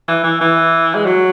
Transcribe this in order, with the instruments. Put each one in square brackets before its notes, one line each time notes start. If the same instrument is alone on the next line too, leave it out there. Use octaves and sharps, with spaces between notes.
[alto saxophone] E3
E3
E3
G#3
F#3